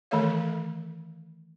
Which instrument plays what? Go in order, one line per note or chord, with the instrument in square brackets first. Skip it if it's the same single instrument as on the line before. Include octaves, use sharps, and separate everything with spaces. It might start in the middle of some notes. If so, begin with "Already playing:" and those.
[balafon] D#3 E3 A3 A4 C#5 F5